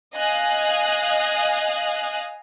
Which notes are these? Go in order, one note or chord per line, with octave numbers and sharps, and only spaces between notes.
D#5 F5 G#5 D#6 F#6